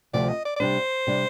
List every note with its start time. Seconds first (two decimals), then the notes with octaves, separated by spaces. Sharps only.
0.13 D2 C3 F3 D5
0.29 D#5
0.45 D5
0.56 D5
0.60 C3 G3 D4 C5
1.07 C3 G3 D4